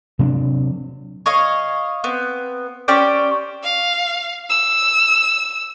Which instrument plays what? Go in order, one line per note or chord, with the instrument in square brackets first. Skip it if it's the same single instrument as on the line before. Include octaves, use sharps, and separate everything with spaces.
[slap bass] C3 F#3 C4 D4
[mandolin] C#5 D#5 F5
B3 C4
C#4 G4 C5 D5
[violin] F5
E6